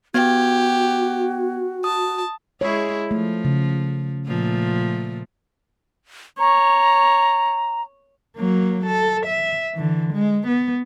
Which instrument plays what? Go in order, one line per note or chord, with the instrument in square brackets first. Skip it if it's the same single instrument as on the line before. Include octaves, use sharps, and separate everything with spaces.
[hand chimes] B3 G#6 [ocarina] F#4 [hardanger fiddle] G4
[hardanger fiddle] A5 [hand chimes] D#6
[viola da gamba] G#3 E4 G#4 [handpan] C#5
[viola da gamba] F3 [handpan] A3
[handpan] C#3
[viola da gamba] A#2 F3 A3
[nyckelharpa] C#5 [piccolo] A#5
[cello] F#3 A#3
A4
E5
D3 E3
G#3
B3